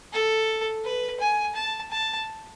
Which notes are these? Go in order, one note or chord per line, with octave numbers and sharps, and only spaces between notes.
A4
B4
G#5
A5
A5